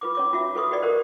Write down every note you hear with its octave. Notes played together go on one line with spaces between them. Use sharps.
F4 B4 D6
C#4 C#5 D6
F4 F#4 E5
F4 A4 B4 C#6 D#6
F#4 G4 B4 D5 D#5
G4 A#4 C5